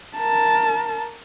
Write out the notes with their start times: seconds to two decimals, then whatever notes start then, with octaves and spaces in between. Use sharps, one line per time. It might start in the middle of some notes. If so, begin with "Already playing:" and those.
0.17 A#4 A5